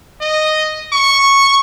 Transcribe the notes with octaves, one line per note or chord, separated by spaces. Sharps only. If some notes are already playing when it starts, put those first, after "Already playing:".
D#5
C#6